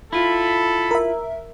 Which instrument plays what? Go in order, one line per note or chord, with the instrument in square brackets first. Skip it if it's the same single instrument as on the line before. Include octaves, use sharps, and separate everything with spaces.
[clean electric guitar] E4 F4 [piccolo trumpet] A4 [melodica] B5
[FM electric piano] A#4 E5